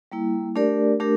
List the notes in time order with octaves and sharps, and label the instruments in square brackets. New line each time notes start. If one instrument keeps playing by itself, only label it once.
[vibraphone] G3 A#3 E4
A3 D4 G4 A#4 D5
A3 D4 G4 A#4